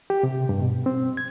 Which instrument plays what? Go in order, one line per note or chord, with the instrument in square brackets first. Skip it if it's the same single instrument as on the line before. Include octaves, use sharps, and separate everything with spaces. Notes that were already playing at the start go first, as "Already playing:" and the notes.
[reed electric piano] G4
C3
G2
B2
C4
G#6